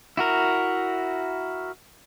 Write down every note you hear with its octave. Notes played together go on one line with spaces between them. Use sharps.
E4 F#4 A#4